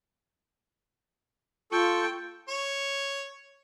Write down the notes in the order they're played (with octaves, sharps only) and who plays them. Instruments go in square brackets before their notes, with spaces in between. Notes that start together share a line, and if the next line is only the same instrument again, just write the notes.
[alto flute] F4 [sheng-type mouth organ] A4 C#6 [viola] G5
[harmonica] C#5